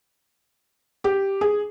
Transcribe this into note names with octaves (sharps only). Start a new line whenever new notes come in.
G4
G#4